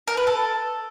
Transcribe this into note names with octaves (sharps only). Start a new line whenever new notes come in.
A#4
B4
A4